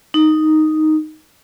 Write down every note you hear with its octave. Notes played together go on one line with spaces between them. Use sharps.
D#4